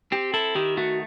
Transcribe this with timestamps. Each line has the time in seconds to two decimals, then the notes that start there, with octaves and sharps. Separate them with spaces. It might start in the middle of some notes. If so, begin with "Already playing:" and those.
0.12 C4 G4
0.34 E4 A4
0.55 D#3 G4
0.77 A3 F#4